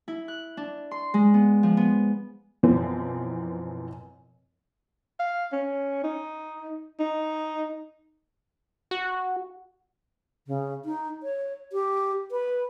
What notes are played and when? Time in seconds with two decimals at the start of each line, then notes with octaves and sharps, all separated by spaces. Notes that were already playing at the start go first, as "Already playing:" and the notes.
0.08 E4
0.28 F#6
0.57 D4
0.91 C6
1.14 G#3
1.34 B3
1.63 F3
1.77 B3
2.63 F#2 B2 E3 F3 C4
5.19 F5
5.52 C#4
6.04 D#4
6.99 D#4
8.91 F#4
10.47 C#3
10.85 D#4
11.23 C#5
11.73 G4
12.31 B4